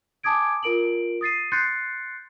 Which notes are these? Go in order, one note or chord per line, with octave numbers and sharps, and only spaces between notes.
G#5 A5 D6 D#6 G#6 D7
F4 A#4 D7 F#7
D#6 A6 C7 D#7
C6 F#6 G6 A6 C7 C#7